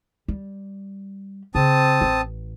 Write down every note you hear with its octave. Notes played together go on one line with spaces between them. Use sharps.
G3
C#3 C4 A5 D#6
A1